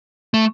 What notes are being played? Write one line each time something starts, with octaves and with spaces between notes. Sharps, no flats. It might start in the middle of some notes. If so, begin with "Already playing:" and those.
A3